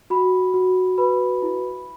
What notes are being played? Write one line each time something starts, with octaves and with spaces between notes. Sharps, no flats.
F#4 B5
F#4
B4 B5
E4